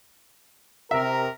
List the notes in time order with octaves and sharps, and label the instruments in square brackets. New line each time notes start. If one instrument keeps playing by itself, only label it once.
[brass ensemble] C3 A#4 [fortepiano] E5